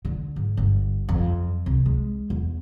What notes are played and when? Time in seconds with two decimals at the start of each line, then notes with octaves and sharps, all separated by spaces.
0.05 D3
0.36 G#2
0.57 G1
1.09 F2
1.66 C2
1.86 G#3
2.30 E2